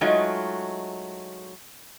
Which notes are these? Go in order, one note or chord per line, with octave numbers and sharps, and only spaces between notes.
F#3 G#3 A3 D#4 F4